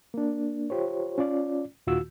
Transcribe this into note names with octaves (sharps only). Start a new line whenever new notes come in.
A#3 D4
F4 G4 C5 C#5
C#4 F4 D5
D#2 A#2 D#3 F4 F#4 E6